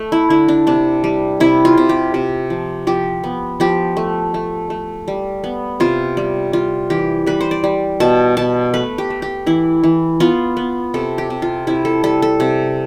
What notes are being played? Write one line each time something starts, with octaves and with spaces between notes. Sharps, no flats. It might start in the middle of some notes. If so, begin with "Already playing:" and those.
Already playing: A3
E4
D3 E4
D4
C3 D4
G3
C3 E4
F4
C3
G4
C3
F3
F3 G4
B3
F3 G4
A3
A3
A3
G3
B3
C3 F4
G3
G3 F4
E3 G4
G3 B4
C5
D5
G3
B2 A5
B2 A5
A3 B4
G4
A3
G4
E3 E4
E3
B3 F4
B3
C3 A4
G4
C3
F4
C3 E4
A4
G3 A4
A4
C3